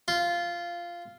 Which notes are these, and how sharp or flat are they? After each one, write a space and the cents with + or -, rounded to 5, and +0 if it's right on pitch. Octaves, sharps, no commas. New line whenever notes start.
F4 -10